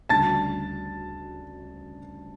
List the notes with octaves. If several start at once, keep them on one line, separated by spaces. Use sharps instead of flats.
D2 C#3 G3 D4 F#4 A5 A6